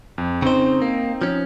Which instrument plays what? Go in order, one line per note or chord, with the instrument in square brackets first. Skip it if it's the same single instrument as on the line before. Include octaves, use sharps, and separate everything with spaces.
[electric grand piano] F2
[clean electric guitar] C#3 C5 [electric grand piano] C4 D#4
[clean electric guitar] A#3
F3 C#4